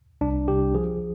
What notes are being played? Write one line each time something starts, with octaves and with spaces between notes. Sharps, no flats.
C2 D4
C2 G4
F3 G#4